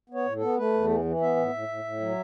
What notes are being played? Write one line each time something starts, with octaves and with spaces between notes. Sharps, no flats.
B3 C#5
A2
A4
B3
A3 B4
E2
E3
E3
B3 E5
A2
A2
A2
A2
F#3